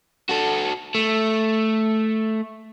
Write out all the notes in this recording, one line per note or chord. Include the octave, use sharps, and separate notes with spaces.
F#4 A4
A3